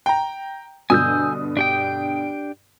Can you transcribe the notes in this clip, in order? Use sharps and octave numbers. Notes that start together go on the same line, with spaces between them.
G5 A#5
G2 B2 D3 G#5 D#6 E6 G6
D4 G4 G5